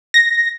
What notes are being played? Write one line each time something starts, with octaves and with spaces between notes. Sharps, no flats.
A#6